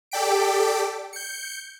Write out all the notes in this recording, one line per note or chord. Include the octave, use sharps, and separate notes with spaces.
G4 A4 D5 G5 B6 D7
G6 C#7